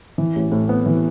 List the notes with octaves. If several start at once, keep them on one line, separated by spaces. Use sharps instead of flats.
E3
A1
A2
B3
E3